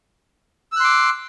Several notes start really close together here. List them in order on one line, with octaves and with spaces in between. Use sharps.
E6 F#6 C6 D6